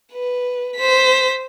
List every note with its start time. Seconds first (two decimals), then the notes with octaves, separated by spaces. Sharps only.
0.13 B4
0.76 C5 B6